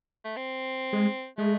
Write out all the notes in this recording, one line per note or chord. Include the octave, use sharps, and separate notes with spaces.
A3
C4
G#3
G#3 A3